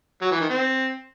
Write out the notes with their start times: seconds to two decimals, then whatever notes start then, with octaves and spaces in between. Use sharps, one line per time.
0.21 F#3
0.31 E3
0.40 D#3
0.50 C4